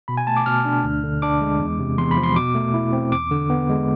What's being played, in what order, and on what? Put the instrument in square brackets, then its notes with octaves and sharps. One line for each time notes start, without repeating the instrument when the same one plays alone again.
[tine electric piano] B2 B5
G#5
A3 A5
D6
B2 F6
D4
D2
D3
D4 D6
G#3
E2
C3
E2 C6
B5
F3
C6
B2 D6
A3
E4
C4
E2 D6
D3
B3
G#3